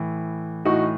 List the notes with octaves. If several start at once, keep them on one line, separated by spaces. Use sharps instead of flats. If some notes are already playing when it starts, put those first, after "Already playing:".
Already playing: A2 E3
A2 E3 D#4 F#4